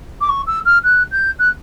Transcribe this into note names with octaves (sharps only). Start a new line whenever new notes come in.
D6
C#6
E6
F6
F#6
G6
F#6